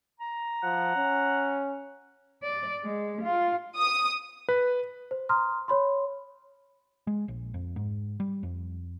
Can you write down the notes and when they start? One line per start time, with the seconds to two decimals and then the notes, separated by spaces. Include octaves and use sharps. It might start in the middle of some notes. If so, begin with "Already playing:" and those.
0.20 A#5
0.63 F3 F#5
0.96 C#4
2.43 D5
2.84 G#3
3.22 F4
3.77 D#6
4.49 B4
5.11 C5
5.29 A#5 C6 D#6 F6
5.68 C#5 B5 C6
7.07 G#3
7.28 A#1
7.54 F2
7.76 G#2
8.20 G3
8.43 F2